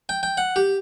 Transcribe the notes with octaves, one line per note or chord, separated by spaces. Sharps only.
G5
G5
F#5
G4